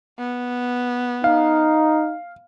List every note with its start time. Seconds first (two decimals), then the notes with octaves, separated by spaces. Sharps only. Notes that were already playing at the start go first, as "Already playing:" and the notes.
0.19 B3
1.24 D#4 F5